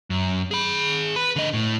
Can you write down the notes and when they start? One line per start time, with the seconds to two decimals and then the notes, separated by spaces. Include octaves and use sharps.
0.10 F#2
0.51 G#4 B5
1.16 B4 B5
1.36 D3 D#5
1.54 A2